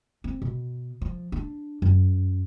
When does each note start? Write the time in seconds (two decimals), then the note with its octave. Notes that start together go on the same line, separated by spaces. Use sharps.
0.24 C4
0.42 B2
1.02 F3
1.32 D4
1.82 F#2